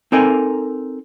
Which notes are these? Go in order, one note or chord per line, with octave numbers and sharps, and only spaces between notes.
C4 D#4 A4 A#4 G#5